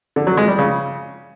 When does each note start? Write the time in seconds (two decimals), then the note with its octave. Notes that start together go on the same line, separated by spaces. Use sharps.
0.16 D3
0.27 F#3
0.37 G#3
0.48 G3
0.59 C#3